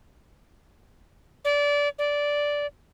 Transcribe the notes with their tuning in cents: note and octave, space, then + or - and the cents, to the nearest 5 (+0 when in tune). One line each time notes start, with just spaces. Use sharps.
D5 -20
D5 -10